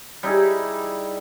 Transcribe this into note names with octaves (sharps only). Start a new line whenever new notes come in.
G3 D#4 E4 G#4